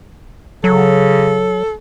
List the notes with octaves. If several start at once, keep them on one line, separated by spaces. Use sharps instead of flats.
C#3 F#3 A4